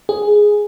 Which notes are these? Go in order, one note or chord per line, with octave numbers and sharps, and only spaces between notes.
G#4